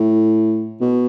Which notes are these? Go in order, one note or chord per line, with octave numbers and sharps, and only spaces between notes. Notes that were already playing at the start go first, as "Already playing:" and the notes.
Already playing: A2
B2